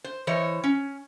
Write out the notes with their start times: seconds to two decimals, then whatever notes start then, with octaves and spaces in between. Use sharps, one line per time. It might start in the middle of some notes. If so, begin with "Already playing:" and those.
0.04 C5
0.27 E3 C5 C#5 D#5
0.64 C#4